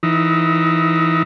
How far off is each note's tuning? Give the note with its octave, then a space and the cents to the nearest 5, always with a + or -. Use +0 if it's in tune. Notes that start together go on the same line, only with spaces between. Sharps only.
E3 +10 D#4 +15